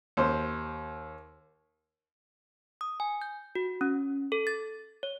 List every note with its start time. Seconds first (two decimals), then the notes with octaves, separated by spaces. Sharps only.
0.17 D#2 C5
2.81 D#6
3.00 G#5
3.22 G6
3.55 F#4
3.81 C#4
4.32 A4
4.47 A6
5.03 C#5